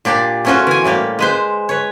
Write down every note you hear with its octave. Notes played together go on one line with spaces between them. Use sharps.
A#2 D4 G4 D5
A3 B3 C#4 F4 F#4 C5
E3 G#5
A2 G3 A#3 G4
G#3 B4 C5
B4 C#5